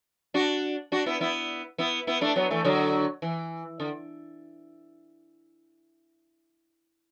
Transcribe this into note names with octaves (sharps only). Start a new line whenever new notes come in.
D4 F#4
D4 F#4
B3 E4
B3 E4
B3 E4
B3 E4
A3 D4
F#3 B3
E3 A3
D3 F#3
E3
D3